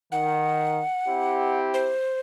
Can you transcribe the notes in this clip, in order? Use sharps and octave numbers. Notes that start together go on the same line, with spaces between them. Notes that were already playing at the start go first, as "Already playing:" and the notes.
D#3 F#5
C4 E4 G4
C5